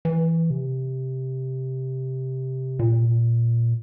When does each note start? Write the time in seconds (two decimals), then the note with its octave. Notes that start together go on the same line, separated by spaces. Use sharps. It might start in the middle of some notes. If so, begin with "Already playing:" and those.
0.05 E3
0.50 C3
2.79 A#2